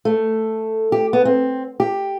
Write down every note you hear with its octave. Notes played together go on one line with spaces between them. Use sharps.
A3
G4
B3
C4
G4